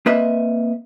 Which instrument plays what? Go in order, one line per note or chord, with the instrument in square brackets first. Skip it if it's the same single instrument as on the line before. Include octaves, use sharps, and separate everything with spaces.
[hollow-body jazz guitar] A#3 C4 B4 D#5 E5